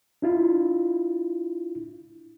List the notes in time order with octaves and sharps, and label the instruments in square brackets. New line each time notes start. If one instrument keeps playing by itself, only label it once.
[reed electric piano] D4 E4 F4